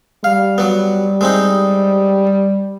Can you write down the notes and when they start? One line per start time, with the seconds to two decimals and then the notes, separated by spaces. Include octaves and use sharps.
0.24 G3 F5
0.58 F#3 B3
1.21 G#3 C4 D#4